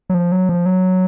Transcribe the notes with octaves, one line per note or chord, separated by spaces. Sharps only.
F#3
F3
F#3
F3
F#3